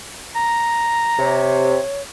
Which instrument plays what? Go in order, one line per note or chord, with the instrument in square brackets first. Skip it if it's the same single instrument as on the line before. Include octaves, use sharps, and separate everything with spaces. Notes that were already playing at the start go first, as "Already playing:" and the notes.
[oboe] A#5
[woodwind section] C3 [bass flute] C#5